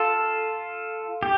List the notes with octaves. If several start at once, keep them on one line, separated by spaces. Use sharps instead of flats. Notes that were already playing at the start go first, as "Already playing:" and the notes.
Already playing: F4 A4
G4